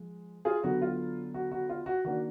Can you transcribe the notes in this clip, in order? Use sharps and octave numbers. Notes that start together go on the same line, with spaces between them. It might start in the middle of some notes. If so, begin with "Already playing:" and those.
Already playing: F3 G#3
F4 G#4
D3 F#3 B3 D4 F#4
F4
F#4
F#4
F4
F#4
D#3 A#3 D4 F#4